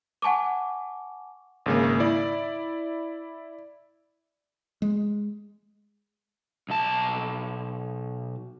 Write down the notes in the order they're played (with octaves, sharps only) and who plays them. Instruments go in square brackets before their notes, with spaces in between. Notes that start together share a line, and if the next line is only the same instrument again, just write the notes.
[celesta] F#5 G#5 A5 C#6 D6
[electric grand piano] G#1 C#3 A#3
E4 D5
[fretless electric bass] G#3
[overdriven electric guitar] B1 A5